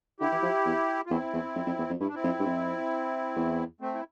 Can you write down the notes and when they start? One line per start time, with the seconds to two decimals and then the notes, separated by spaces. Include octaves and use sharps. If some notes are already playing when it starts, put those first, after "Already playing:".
0.20 D3 E4 G4
0.32 E3
0.43 F3
0.66 E2
1.06 F4
1.10 E2 C4 E4
1.33 E2
1.55 F2
1.67 F2
1.78 E2
1.90 F2
2.00 G2 E4
2.08 D4
2.15 C4 E4
2.24 F2
2.39 G2
2.46 F2
3.36 E2
3.81 A3 C4
3.94 E4